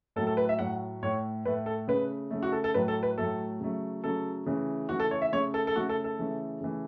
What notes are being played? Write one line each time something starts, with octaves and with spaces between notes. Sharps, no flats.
A2 F#3 A3 A4
A4
B4
E5
A2 F#3 A3 F#5
A2 A3 C#5
A2 A3 B4
A4
C#3 A3 B4
C#3 A3
F#4
A4
A4
A2 F#3 A3 B4
A4
B4
A2 F#3 A3 A4
C#3 F#3 A3
C#3 F#3 A3 A4
C#3 E3 A3
C#3 E3 A3 F#4
A4
C#5
E5
C#3 A3 C#5
A4
A4
C#3 A3 F#4
A4
A4
C#3 E3 A3
C#3 E3 A3